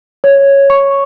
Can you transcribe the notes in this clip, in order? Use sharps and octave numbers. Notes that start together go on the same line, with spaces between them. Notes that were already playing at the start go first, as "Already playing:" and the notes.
C#5
C#6